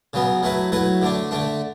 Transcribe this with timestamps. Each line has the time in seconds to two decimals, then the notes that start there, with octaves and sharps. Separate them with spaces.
0.13 C#3 F#3 B3
0.43 F#3 A3 E4 B4
0.72 F#3 A3 E4 B4
1.02 D3 A3 D4
1.31 D3 A3 D4